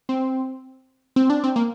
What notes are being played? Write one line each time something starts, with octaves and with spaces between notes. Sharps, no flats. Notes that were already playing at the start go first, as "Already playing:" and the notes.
C4
C4
D4
C4
A#3